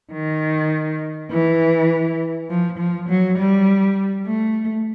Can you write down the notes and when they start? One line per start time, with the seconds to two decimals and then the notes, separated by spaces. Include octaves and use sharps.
0.12 D#3
1.31 E3
2.50 F3
2.79 F3
3.09 F#3
3.39 G3
4.27 A3